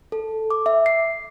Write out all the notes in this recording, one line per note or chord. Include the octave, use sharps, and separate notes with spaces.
A4
D6
E5
C7